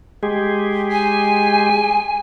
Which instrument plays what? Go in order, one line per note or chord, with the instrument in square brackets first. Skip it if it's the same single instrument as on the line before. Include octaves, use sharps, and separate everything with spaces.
[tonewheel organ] G#3 G4 G#4
[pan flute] G#5